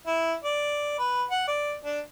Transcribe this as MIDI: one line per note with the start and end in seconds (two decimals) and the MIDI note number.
0.07 0.34 64
0.44 0.94 74
0.99 1.24 71
1.31 1.47 78
1.48 1.74 74
1.85 2.00 62